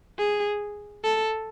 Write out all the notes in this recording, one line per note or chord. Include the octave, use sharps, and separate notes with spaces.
G#4
A4